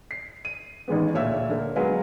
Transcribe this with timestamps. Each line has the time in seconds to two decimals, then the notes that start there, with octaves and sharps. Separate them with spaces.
0.11 C7
0.45 D#7
0.88 A1 D#3 G#3 B3
1.14 D2 A#2 C#5 E5 F5 E6
1.49 D3 A#3
1.76 F#3 G#3 B3 G#4 B4 F5